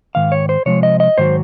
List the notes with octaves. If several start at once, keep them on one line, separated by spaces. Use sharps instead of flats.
G#2 D#3 F5
C#5
C5
C3 F3 G#3 C#5
D#5
D#5
G#2 D#3 F#3 C5